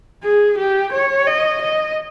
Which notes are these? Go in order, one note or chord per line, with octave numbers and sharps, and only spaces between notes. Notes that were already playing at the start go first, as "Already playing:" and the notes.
G#4
G4
C#5
D#5
D#5